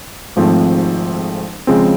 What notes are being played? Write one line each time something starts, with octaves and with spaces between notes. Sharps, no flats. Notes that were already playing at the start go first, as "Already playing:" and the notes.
G#1 G#2 F3 A3 C4
C#3 F3 G#3 C4